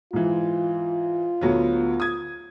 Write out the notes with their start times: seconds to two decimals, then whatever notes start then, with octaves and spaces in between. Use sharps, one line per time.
0.13 G#2 E3 F4
1.41 D2 F#3 B3
2.00 D#6 G#6